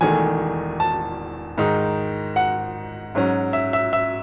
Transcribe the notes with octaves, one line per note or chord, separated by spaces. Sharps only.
E1 E2 D#3 A3 G#5
A5
G#2 D#3 G#3 D#4
F#5
G#2 F#3 C#4
E5
E5
E5